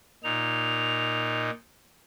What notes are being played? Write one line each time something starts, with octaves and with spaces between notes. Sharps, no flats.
A#2 D#4 F7